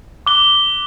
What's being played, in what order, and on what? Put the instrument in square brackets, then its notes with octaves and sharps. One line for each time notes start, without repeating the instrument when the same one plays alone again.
[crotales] D6 F#6 G7